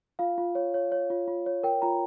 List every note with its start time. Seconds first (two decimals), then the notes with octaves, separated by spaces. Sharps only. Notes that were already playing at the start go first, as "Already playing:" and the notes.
0.19 F4 F5
0.38 F4
0.55 C#5
0.74 C#5
0.92 C#5
1.10 F4
1.28 F4
1.46 C#5
1.63 A#4 G5
1.82 F4 A#5